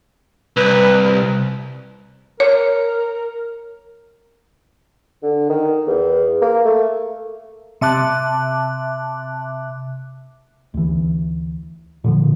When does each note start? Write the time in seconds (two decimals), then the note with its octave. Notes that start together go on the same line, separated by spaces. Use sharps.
0.57 C2 B4
2.40 A#4 C#5
5.23 D3
5.49 D#3
5.87 E2
6.42 A#3
6.65 A3
7.81 C3 E5 A5 D6 F#6
10.74 D2 E3
12.04 A#2 D3 E3 F3